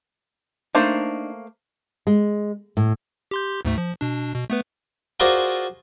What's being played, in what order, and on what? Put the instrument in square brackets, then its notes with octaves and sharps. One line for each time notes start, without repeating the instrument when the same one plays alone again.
[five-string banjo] A3 A#3 C5 [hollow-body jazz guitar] D4 D#4
[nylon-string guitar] G#3
A2
[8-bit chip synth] G4 C6 G6
D2 G#2 A3
F3
B2 D4
B2
A3 B3 B4
[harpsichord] F4 F#4 G#4 A#4 C5 D5